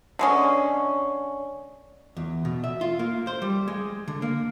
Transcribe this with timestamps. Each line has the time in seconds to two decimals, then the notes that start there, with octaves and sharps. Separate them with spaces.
0.19 D3 G#3 C#4
2.17 E2
2.45 B2
2.64 E5
2.81 F4
2.99 A#3
3.27 C5
3.42 G3
3.68 G#3
4.08 D3
4.22 A#3